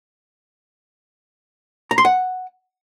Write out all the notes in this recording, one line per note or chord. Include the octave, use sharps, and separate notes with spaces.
A#5
C6
F#5